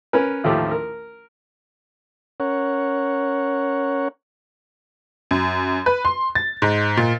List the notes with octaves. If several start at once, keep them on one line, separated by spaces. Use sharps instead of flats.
C#4 A#4 B4
A1 D#2 F3 A3 G4
A#4
C#4 A#4 C#5 F#5
F#2
B4
C6
A6
G#2
A#2